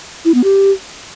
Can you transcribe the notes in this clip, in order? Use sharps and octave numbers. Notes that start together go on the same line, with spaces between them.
E4
B3
G4